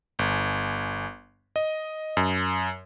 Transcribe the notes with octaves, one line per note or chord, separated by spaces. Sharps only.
G1
D#5
F#2